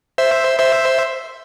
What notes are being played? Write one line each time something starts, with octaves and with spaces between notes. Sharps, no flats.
C5 E5
C5 E5